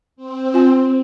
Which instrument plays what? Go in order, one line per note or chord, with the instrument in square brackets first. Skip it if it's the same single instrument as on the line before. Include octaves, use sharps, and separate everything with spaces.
[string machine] C4
[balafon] F4 G#5